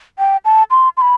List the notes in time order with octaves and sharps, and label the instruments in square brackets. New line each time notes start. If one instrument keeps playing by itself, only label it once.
[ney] G5
A5
C6
C6
B5